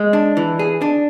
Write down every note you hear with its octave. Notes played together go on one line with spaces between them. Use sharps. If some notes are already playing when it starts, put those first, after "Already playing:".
Already playing: G#3
D4
E3
G#4
D4